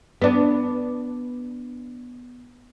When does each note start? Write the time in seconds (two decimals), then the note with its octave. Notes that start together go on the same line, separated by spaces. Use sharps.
0.22 B3 D4